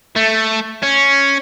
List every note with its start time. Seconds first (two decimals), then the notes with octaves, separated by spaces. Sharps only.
0.16 A3
0.83 C#4